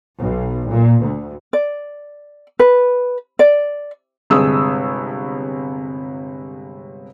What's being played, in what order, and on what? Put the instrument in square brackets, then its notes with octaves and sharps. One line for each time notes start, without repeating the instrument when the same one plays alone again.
[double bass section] B1
A#2
D2
[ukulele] D5
B4
D5
[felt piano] G1 C3 G#3 D#6 E6